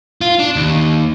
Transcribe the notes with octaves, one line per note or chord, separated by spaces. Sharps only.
F4
D4
D#2